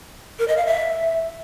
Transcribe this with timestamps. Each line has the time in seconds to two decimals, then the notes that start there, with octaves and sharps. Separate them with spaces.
0.39 A#4
0.48 D#5
0.57 F5
0.66 E5